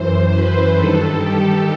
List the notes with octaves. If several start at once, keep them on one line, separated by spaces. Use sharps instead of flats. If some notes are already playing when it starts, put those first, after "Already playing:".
Already playing: F#2 E3 C5
B4
G2 D#3 A4
G4